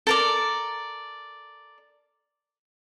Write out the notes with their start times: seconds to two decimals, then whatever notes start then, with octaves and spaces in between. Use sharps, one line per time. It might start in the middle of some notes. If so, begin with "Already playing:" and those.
0.07 A4 A#4 D5